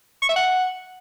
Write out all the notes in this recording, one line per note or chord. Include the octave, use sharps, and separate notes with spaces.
C#6
E5
F#5